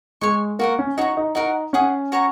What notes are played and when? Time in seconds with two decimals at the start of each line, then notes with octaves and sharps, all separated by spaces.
0.21 G#3 C#5 G#5 C#6
0.59 A#3 F#4 A#4 F#5
0.79 C#4
0.97 D#4 F#4 C#5 A#5
1.17 D#4
1.35 D#4 F#4 A#4 F#5
1.73 C#4 G#4 F#5 D#6
2.12 F#4 C#5 A#5